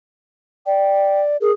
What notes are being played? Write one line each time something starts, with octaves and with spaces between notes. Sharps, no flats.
D5 G5
G#4 A#4